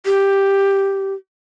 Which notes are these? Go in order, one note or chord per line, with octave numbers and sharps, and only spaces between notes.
G4